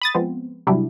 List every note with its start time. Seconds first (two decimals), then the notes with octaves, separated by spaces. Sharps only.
0.02 B5 D#6 A6
0.15 F3 G#3 B3 C4
0.67 G2 C3 F#3 G3 D4 E4